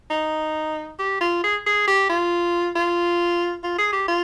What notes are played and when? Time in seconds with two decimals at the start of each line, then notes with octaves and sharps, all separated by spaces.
0.10 D#4
0.99 G4
1.21 F4
1.44 G#4
1.66 G#4
1.87 G4
2.09 F4
2.75 F4
3.63 F4
3.78 G#4
3.93 G4
4.08 F4